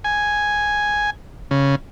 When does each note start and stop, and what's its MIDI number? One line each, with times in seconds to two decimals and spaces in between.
0.04 1.10 80
1.51 1.75 49